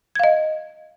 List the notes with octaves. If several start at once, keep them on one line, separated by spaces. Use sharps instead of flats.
D#5 F5 G#6